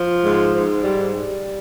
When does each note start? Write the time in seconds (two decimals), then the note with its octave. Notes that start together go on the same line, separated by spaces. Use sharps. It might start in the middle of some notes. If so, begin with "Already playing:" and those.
Already playing: F3
0.24 G#2
0.54 G#2
0.84 G3
1.13 G3